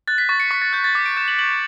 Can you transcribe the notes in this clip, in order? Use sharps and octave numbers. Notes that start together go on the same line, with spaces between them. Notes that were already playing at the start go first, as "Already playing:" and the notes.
F#6 A6
B6
C#6 A6
C#7
C#6 B6
A6
F#6 G6
A6
D6 B6
D7
G6 E7
F#7
G6 F#7